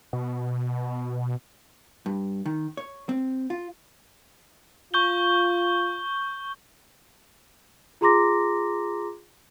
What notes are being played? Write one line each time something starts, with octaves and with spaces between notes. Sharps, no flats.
B2
G2
D#3
C#5
C4
F4
F4 C#6 G6 G7
F4 G#4 A#5 C6 D6 A#6